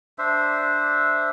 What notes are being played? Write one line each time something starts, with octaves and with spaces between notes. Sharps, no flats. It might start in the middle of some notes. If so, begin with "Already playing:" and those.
D4 C5 E5